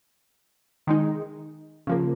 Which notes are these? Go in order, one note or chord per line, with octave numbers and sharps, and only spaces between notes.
D#3 G#3 D#4
C#3 F3 A#3